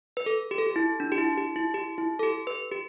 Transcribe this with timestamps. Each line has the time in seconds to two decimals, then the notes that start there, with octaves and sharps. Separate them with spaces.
0.17 B4
0.26 A4
0.51 G4
0.58 A4
0.67 G4
0.76 E4
1.00 D4
1.12 G4
1.18 E4
1.37 G4
1.56 E4
1.74 G4
1.98 E4
2.19 A4
2.23 G4
2.47 B4
2.71 G4